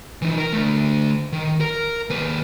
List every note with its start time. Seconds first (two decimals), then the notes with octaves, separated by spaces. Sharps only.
0.22 E3 D#4
0.37 A#4
0.53 D3 A3
1.32 D#3
1.61 A#4
2.10 D#2 B4